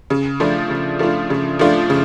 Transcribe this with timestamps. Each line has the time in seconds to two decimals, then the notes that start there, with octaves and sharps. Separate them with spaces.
0.10 C#3
0.40 F3 A3 D4 F4
0.70 C#3
0.99 F3 A3 D4 F4
1.30 C#3
1.59 F3 A3 D4 F4
1.90 C#3